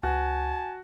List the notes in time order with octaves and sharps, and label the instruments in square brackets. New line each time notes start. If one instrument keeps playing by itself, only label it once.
[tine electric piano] C#2 [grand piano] F#4 [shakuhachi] G#5 [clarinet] A5